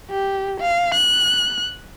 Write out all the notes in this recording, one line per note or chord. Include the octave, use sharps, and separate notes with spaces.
G4
F5
F#6